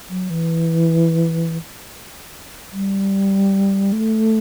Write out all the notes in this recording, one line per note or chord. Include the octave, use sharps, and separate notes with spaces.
F#3
E3
G3
A3